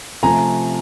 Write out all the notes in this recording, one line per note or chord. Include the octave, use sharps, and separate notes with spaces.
C3 F3 A3 G#5 A#5